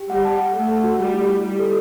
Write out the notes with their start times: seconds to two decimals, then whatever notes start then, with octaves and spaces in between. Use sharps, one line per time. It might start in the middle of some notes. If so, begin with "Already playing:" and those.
Already playing: G4
0.09 G3 F#5
0.25 A5
0.39 F#5
0.54 A3 F#5
0.69 F#5
0.84 F#4
0.99 G3 A3
1.14 E4
1.29 E4
1.44 G3 E4
1.59 A4